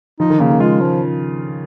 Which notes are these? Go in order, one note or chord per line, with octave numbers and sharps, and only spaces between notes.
F3 D#4
D#3
C#3 A#3
D#3
G#3 F4
F3